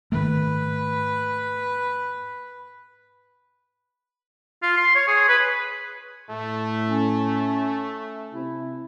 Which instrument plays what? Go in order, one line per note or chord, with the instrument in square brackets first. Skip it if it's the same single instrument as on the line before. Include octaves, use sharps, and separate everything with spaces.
[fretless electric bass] G#2 D#3 A3 [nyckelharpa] B4
[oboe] F4
C6
C#5
G#4
B4
[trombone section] A2 [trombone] A3
[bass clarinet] C#4
[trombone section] C3 [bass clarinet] E4